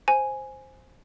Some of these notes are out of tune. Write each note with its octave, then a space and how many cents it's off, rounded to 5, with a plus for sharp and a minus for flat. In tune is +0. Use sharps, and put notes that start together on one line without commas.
C5 +5 G#5 +0